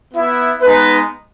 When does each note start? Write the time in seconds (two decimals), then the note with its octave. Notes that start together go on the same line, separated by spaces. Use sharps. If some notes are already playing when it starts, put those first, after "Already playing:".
0.12 B3 E4
0.62 G#3 B3 D#4 B4